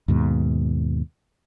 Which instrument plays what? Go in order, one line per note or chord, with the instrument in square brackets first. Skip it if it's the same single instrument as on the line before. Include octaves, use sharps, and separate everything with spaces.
[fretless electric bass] D#2 G#2 B2